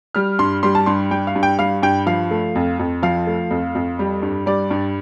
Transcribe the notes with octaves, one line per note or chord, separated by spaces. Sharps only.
G3 F6
G2 C6
G3 C6
A5
G2 C6
G3 G5
F5
G2
G5
G3 F5
G2 G5
F3 F5
A3
F2
F2
F3 F5
A3
F2
F2
G3
G2
G3 D5
G2